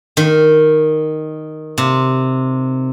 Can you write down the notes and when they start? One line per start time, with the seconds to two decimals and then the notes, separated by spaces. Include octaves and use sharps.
0.17 D#3
1.78 C3